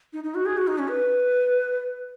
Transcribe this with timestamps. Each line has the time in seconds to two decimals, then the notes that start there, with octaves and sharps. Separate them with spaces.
0.13 D#4
0.24 D#4
0.35 F#4
0.46 G#4
0.57 F#4
0.67 D#4
0.78 C#4
0.89 B4